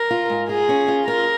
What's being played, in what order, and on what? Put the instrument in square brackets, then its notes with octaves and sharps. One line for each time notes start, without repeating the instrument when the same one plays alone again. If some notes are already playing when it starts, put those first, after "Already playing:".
Already playing: [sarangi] A#4
[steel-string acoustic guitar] F4
G#2
[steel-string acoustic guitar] F4 [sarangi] G#4
[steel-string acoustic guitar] C#4
F4
[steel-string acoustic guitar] F4 [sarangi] A#4